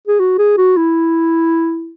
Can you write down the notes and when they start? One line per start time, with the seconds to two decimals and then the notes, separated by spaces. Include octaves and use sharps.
0.07 G#4
0.20 F#4
0.38 G#4
0.57 F#4
0.77 E4